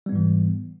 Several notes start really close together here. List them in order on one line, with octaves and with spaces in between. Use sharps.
G3 B3 G#2 E3